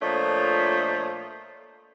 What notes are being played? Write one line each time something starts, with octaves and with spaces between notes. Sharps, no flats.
A#2 F3 A3 D4 C#5 D#5